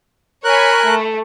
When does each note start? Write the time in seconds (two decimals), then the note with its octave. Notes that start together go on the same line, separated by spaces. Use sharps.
0.44 A#4 C#5 G#5 B5 F#6
0.84 A3